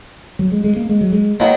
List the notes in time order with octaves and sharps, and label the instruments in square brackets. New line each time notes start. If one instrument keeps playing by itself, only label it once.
[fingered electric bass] F#3
G#3
G#3
A#3
G#3
F#3
G#3
[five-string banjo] D#3 F#3 B3 [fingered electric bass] A#3